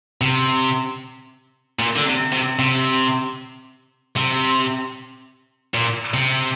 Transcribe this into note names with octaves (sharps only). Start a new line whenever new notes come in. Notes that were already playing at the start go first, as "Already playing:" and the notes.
C3
A#2
D3
C3
C3
C3
C3
A#2
C3